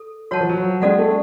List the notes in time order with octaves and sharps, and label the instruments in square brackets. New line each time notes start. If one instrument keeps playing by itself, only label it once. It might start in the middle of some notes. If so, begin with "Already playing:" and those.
Already playing: [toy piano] A4
[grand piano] F#3 [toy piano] F#4 C#5 F#5 A5
[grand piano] F3
F#3
[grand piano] G#3 [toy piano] C#4 F#4 A4 D5 F#5
[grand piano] A3